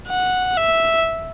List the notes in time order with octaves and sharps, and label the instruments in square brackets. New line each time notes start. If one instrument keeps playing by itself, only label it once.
[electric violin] F#5
E5